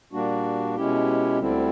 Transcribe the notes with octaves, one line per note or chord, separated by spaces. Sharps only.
A#2 G3 A#3 D4 F#4
B2 G#3 C#4 E4 G4
D2 D3 G3 C4 E4